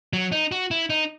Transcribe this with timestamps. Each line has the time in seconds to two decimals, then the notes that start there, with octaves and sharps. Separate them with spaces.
0.13 F#3
0.32 D#4
0.52 F#4
0.71 E4
0.90 D#4